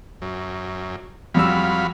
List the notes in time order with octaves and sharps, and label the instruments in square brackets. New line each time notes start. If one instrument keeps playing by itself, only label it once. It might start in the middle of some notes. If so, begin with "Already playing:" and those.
[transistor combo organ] F#2
[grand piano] F2 G3 E6 [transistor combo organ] F#3 F5 B5